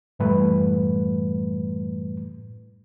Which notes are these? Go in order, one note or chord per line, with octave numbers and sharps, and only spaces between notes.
F#2 A2 E3 G3 A3 B4